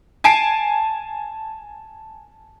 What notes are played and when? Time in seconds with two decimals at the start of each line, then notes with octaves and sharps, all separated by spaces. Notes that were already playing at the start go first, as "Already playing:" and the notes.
0.24 G#5 A5 C7 D7